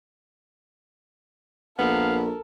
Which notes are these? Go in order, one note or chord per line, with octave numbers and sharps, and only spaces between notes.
A#1 B3 A4 A#4 F5